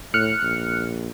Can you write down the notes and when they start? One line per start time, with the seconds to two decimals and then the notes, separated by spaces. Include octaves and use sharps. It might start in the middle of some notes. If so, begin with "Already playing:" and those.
0.14 A2 F6 F#6 C#7
0.43 A#1